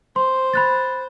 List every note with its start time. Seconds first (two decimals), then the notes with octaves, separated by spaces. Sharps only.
0.16 C5 C6
0.54 B5 F#6 A6